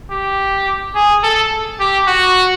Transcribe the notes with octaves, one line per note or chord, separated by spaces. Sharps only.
G4
G#4
A4
G4
F#4